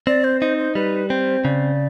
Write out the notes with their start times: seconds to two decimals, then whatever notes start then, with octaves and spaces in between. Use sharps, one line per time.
0.07 C4 D5
0.24 C5
0.41 D#4 C5
0.58 C5
0.75 G3 B4
1.10 C4 C5
1.44 C#3 D5